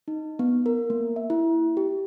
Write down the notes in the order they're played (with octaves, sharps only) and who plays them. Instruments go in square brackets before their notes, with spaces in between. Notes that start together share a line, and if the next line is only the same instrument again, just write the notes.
[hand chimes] D#4
B3
A#4
A#3
E5
E4
G4